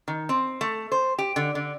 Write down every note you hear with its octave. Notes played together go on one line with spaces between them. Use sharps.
D#3
C4
A3
C5
G4
D3
D3